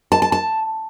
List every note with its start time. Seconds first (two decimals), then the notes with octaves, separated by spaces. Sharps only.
0.12 A5
0.22 A5
0.32 A5